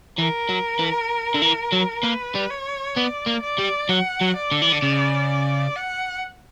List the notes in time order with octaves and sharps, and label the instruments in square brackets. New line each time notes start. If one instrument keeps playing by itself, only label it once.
[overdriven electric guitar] E3 [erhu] A#4
[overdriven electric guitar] F#3
E3
D3
E3
F#3
[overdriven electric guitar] A#3 [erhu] B4
[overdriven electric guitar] G3
[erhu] C#5
[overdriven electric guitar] B3 [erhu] D5
[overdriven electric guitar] A#3
[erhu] D5
[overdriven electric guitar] G3
[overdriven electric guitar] F#3 [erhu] F#5
[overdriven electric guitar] F#3
[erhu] D5
[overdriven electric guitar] D3
E3
D3
C#3
[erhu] F#5